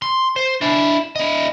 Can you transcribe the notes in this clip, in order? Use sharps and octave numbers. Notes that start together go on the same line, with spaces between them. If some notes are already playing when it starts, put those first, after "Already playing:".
C6
C5
D4 E4
E4 D#5